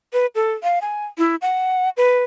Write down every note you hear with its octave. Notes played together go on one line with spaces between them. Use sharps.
B4
A4
F5
G#5
E4
F#5
B4